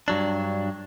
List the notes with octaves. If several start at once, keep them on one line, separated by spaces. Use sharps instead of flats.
G2 F#3 D4